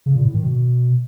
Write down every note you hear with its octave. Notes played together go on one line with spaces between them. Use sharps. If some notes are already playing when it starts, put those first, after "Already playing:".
C#3
A#2
A2
D#3
B2